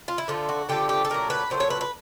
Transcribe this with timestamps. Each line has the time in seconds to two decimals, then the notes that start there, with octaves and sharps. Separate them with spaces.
0.08 F4
0.18 E4
0.28 D3 F3 A3 F4
0.49 F#4
0.69 D3 F3 A3 G4
0.89 G4
1.05 A4
1.10 A#2 F#3 A3 A#4
1.30 B4
1.50 A#2 F#3 A3 C5
1.60 C#5
1.70 B4
1.81 B4